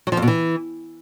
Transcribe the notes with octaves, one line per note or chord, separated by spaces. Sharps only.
F#3
F3
F2
B2
E3